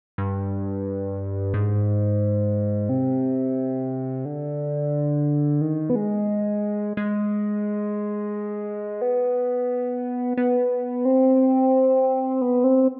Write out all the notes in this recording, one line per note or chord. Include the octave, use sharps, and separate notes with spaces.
G2
G#2
C3
D3
D#3
B3
G#3
G#3
B3
B3
C4
B3
C4